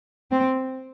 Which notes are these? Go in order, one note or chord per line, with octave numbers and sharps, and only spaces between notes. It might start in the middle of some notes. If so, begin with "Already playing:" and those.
C4